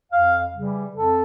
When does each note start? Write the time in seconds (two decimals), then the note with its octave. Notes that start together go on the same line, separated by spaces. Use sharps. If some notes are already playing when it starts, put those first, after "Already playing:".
0.12 F2 F5
0.54 C#3 E3 G3
0.96 F2 A4